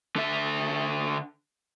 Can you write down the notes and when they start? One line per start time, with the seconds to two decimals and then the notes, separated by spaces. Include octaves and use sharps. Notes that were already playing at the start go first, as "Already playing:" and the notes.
0.16 D3 E5